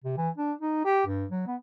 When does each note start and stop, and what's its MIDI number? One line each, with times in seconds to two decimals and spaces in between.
0.04 0.16 48
0.17 0.29 52
0.37 0.52 62
0.61 0.81 63
0.85 1.04 67
1.06 1.25 43
1.31 1.44 54
1.47 1.56 59